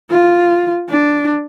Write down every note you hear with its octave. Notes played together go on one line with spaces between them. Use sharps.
F4
D4